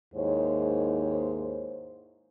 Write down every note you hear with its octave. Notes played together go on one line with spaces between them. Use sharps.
D#2 G#2 E4 C5 C#5